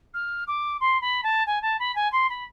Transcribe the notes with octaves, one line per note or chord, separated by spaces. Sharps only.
F6
D6
C6
B5
A5
G#5
A5
B5
G#5
C6
B5